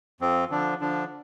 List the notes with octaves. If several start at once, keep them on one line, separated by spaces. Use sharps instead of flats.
F2 F3 C4
D3 F3 D4
D3 F3 D4